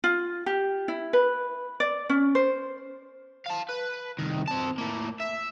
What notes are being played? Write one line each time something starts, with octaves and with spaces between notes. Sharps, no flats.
F4
G4
E4
B4
D5
C#4
C5
F5 A5
B4
C2 D#3
C4 A5
A2 A#3
E5